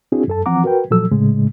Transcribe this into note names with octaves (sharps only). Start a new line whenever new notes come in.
C4 D4 E4 F#4 G#4
F#2 A4 A5
E3 F3 C4 F#5 A#5 D6
F#4 A#4 B4 G5
A#2 F3 F#3 A4 E6
A2 C#3 G#3